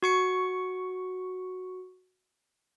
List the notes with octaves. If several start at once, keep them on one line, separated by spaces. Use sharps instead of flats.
F#4 C#6 C#7